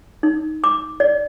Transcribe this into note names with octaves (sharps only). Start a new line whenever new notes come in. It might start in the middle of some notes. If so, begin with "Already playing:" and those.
D#4
D6
D5